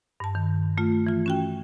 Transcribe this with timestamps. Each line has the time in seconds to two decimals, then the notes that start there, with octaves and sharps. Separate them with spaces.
0.20 G2 A5
0.35 D#3
0.78 A3 F4
1.07 E3 F4
1.26 C#4 F#4 G5